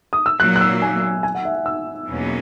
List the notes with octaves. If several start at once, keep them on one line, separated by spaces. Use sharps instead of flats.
D#6
E6
A#2 F#3 A#3 F#6
F#6
E6
G#5
G#5
F#5
E5
F#5
E6
E2 B2 F#3 A#3 C#4